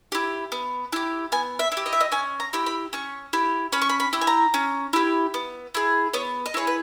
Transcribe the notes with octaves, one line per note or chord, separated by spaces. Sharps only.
E4 G4
B3
E4 G4
B3 G#5
E5
E4
G4
D#5
E5
D#5
C#4 G#5
A#5
E4 G4
B5
C#4 C#6
E4 G4
C#4 B5
C#6
B5
B5
E4 G4
G#5
A#5
C#4
E4 G4
B3
E4 G#4
B3 C#5
D#5
E4 G#4 C#5
B4